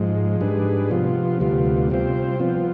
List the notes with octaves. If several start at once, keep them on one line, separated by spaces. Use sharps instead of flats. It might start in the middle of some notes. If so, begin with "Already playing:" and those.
Already playing: G#2 F3 G#3
G#2 G3 D4 G#4 B4
C3 F3 B3 F4
D2 C3 G3 B3 F4
C3 G3 C4 F4 C5
F3 B3 F4